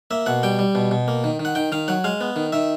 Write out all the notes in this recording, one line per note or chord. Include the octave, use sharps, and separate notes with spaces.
A#3 E5
B2 F#5
G3 G5
G3
B2
B2
A#3
D#3
D#3
F#5
D#3 G5
D#3 F5
F#3 F#5
G#3 F5
B3
D#3
D#3 E5